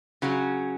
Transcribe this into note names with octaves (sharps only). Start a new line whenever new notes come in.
C#3 F#3 C#4